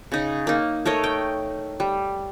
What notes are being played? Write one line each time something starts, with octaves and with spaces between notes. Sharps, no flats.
C#3 D#4
A#3 D#4
A3 A#4 C#5 D#5
G5
G3